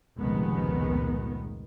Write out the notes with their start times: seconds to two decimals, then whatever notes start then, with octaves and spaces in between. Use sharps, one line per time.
0.17 F1 C#2 A#2 D#3 G#3 B3